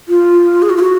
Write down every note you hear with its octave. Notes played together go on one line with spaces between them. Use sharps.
F4
G#4
F#4
F4
F#4